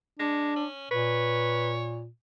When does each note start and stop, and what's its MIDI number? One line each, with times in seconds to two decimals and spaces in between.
0.19 0.53 56
0.19 0.65 62
0.56 0.89 61
0.91 2.08 46
0.91 1.74 71
0.91 1.99 73